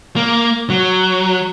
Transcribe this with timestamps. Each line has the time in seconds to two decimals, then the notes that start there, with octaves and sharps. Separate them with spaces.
0.16 A#3
0.70 F#3